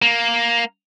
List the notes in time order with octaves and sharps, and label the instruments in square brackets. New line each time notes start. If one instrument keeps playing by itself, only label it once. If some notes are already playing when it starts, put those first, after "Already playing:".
[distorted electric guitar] A#3